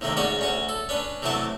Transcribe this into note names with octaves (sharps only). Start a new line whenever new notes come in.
D#2 C3 D#3 A3 A#3
G#2 C#4 F#4 D5
D2 C#4 F#4
A4
C#4 D4 B4
C3 E3 F#3 A3 A5 D6